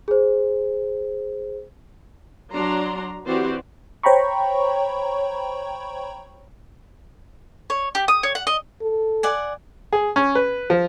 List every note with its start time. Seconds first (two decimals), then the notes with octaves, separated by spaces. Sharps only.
0.08 G#4 C5
2.55 F#3 D4 A#5 C6
3.26 E3 C4 F#4 G4 C5 D5
4.03 C5 C#5 G5 A#5 B5 C#6
7.70 C#5
7.95 G4
8.08 D#6
8.23 C#5
8.35 F#5
8.47 D#5
8.82 A4
9.23 D5 F#5 G#5
9.93 G#4
10.16 C#4
10.35 B4
10.70 F3